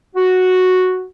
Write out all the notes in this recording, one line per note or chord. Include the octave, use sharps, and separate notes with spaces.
F#4